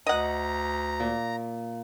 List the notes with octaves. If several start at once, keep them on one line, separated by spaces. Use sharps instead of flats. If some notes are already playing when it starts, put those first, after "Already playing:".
D2 D#5 F#5 A#5
A#2